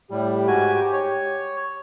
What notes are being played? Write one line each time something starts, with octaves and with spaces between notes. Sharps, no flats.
A2 G3 G4
G#2 F#4 G#5
C#5